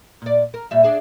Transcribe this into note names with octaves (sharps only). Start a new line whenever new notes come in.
A#2 D5
A#4
A#2 G3 E5
D4 G#4 D#5